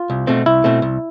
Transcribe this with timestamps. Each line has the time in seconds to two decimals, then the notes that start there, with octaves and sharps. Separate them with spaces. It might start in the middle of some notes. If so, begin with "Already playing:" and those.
Already playing: F4
0.10 C2
0.27 B2 A3 C4
0.46 C2 E4
0.64 B2 A3 C4
0.82 C2